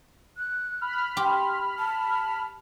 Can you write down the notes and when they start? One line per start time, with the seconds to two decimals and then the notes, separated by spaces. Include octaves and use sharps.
0.38 F#6
0.81 B5 F6
1.17 G4 C6
1.79 A5